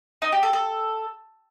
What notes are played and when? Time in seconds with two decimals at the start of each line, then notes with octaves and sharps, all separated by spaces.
0.22 D#4
0.32 G4
0.43 A4
0.53 A4